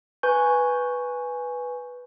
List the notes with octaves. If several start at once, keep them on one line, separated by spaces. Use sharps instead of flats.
B4 G#5 C#6 G6